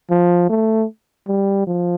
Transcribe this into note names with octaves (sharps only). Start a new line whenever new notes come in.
F3
A3
G3
F3